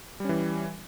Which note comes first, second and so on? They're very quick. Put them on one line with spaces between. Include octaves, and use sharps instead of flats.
G3 C#4 E3